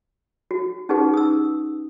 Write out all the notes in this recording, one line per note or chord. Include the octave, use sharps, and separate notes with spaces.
F#4
C#4 D#4 G4 G#4 B4 F#5
D#6 E6